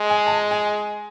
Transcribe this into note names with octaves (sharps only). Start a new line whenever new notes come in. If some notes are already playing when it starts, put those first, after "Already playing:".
Already playing: G#3
G#5
A5
G#5
G#5